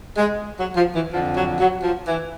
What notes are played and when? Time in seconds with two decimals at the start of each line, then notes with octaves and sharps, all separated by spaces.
0.17 G#3
0.58 F#3
0.76 F3
0.94 E3
1.12 F2 D3 F3
1.36 F#3
1.59 F#3
1.83 F3
2.07 E3